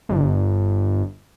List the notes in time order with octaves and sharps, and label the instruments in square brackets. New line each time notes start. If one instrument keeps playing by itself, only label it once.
[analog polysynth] G1